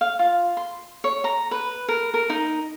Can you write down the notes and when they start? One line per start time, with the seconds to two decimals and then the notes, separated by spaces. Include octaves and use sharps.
0.01 F5
0.19 F4
0.57 C6
1.04 C#5
1.24 A#5
1.51 B4
1.88 A#4
2.14 A#4
2.30 D#4